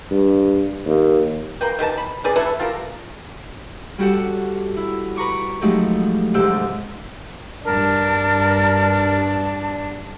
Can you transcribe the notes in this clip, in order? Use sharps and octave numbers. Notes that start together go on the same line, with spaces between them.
G2
D#2
A#3 B4 G5
D#3 G4 B4 A5
B5
C4 G#4 B4 D5
A3 E4 A4 B4
F4 G4 A4 A#4
G3 C#4 F#4 G4 A4 F#5
E4
B4 A#5 C#6 D6
F3 F#3 G#3 A3 D#4 G4
D2 G#2 C3 G4 E6
G2 D4 A#4 A5